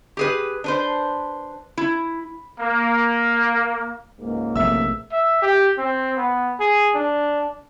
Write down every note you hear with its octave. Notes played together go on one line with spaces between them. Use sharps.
G4 G#4 B4
D4 B4 C5
E4
A#3
C#2 G#2 A#3
A#1 C3 A3 E5 E6
E5
G4
C4
B3
G#4
D4